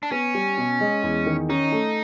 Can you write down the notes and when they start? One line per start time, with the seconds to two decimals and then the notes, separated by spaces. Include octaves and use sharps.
0.03 D4
0.11 B3 C#4
0.34 G3
0.58 B2
0.81 G#3
1.03 E2
1.26 D#3
1.49 C#4 D#4
1.72 A3